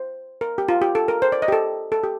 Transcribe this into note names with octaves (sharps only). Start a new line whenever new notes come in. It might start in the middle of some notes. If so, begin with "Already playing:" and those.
Already playing: C5
A#4
G4
F4
G4
A4
A#4
C5
D5
D#5
G4
A4
A4
G4